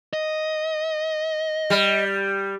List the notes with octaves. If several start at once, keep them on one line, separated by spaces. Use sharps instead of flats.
D#5
G3